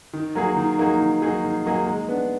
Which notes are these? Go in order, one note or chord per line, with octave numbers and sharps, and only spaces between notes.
D#3
F#3 A#3 D#4 G#4
D#3
F#3 A#3 D#4 G#4
D#3
F#3 A#3 D#4 G#4
D#3
F#3 A#3 D#4 G#4
G#3
B3 D4